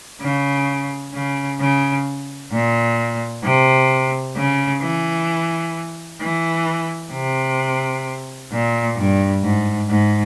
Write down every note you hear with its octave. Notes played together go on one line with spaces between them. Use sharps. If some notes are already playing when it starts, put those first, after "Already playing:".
C#3
C#3
C#3
A#2
C3
C#3
E3
E3
C3
A#2
G2
G#2
G#2